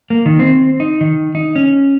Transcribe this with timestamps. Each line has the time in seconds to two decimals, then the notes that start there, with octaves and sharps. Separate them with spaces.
0.10 A#3
0.26 D#3
0.39 C4
0.80 D#4
1.01 D#3
1.35 D#4
1.56 C#4